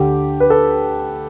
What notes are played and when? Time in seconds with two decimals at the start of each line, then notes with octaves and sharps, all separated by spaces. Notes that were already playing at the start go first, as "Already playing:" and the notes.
Already playing: D2 D3 G4
0.40 B4
0.50 A4